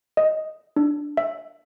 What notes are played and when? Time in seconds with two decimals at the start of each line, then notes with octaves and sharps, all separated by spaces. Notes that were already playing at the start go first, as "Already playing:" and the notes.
0.17 D#5
0.76 D4
1.17 E5